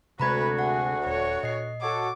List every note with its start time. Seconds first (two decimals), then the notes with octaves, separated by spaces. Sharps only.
0.20 D2 C3 G#3 F#4 B4 A#5 B5 G#6
0.59 G#4 F#5
1.06 D#1 C#5
1.43 A#2 D#5 C7
1.81 F#4 A4 C#5 D6